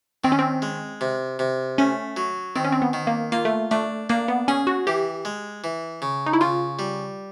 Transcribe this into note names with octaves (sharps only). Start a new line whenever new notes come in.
D#3 C4
C#4
C4
G#3
C3
C3
A3 C#4
F#3
D#3 C4
C#4
C4
B3
D#3
A#3
A#3 F4
A3
A3 D4
A#3 D4
B3
C#4 G#4
F#4
E3 G4
G#3
E3
C#3
D#4
E4
C#3 F4
G3